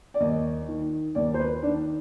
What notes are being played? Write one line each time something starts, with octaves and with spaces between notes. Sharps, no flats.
D5
D#2 D#5
D#3
D#2 D5
C5
B4
D#3 D4